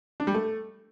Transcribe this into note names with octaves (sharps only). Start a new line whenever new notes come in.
D4
G3
A3